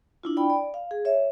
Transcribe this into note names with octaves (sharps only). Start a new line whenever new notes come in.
D4 E4 F4
D5 G5 B5
D5
F5
G#4
C#5 E5